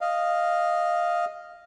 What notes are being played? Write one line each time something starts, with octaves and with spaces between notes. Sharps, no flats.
D#5 F5